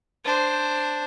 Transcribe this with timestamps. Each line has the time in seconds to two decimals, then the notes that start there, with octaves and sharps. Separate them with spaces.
0.25 D4 C5